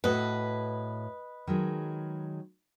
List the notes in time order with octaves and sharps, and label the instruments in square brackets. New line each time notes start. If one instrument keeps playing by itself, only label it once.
[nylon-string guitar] A2 F#4 A4 [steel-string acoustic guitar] B4 D#5
[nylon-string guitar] D#3 F#3 G#3